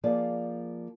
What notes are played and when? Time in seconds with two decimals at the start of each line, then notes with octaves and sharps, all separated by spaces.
0.04 F3 A#3 G#4 D5